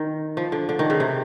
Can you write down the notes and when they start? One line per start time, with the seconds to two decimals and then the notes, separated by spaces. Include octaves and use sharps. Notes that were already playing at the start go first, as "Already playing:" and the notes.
Already playing: D#3
0.37 F3
0.52 D3
0.69 D3
0.79 D#3
0.90 C#3
1.00 C3